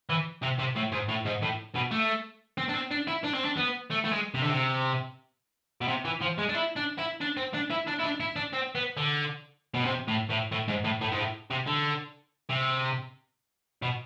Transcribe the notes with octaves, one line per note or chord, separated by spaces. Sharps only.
E3
C3
C3
A2
G#2
A2
G#2
A2
B2
A3
C4
D4
C4
D4
E4
D4
C4
D4
B3
A3
A3
G#3
C3
D3
C3
B2
C3
E3
F3
G#3
D4
E4
D4
E4
D4
C4
D4
E4
D4
E4
D4
E4
D4
C4
B3
D3
B2
C3
A2
A2
A2
G#2
A2
A2
G#2
A2
C3
D3
C3
B2